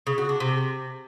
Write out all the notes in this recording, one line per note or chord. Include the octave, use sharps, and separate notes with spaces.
C#3
F#4
D4
C3